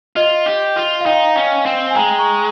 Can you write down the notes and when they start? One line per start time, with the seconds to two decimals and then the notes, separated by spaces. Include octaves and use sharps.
0.16 F4 D#5
0.46 G4
0.76 F4
1.01 F5
1.06 D#4 D#5 G5
1.35 C#4
1.66 C4
1.90 G#5
1.95 G#3 G5 A#5
2.19 A#5 C#6